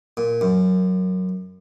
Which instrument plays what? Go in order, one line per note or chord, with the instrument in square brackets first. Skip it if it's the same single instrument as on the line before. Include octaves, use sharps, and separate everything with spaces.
[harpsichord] A#2
F#2